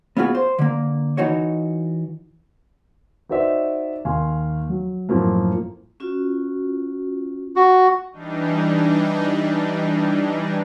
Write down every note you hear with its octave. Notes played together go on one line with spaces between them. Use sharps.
B3 F4 F#4 G#4
C5
D3 A#3
E3 D#4 F#4 C#5
D#4 F#4 C5 D5 E5
D#2 F5 G#5 C6
F#3
F#2 A2 F3 F#3 A#3
C#4 F4 F#4
F#4
E3 G3 D4 D#4